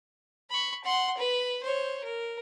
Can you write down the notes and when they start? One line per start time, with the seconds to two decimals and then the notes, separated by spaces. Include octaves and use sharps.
0.50 B5 C#6
0.84 F#5 C6
1.17 B4
1.63 C5 C#5
2.04 A#4